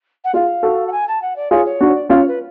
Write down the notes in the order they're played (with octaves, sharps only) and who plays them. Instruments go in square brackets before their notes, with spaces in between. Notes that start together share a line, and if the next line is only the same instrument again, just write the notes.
[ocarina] F#5
[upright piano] F4 G#4 [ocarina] F5
[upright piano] F#4 A4
[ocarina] F#5
G#5
A5
F#5
D5
[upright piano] F4 G#4 [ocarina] C#5
[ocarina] C#5
[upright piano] D4 F#4
[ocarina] C#5
D5
[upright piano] C#4 F4 [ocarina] C#5
[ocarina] B4